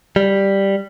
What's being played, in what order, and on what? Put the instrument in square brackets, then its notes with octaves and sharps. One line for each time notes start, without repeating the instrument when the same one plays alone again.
[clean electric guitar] G3